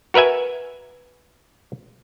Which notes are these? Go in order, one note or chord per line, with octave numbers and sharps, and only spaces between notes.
F#4 A#4 B4 E5 G#5